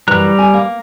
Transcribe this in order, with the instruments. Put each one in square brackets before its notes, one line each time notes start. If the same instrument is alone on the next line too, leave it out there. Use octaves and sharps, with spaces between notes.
[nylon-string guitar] F#2 E3 [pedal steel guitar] G3 A#5 F#6
[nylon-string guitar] G#5
A#3